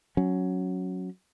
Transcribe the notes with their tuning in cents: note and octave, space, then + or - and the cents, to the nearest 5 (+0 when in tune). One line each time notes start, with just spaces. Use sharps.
F#3 +0 C#4 +0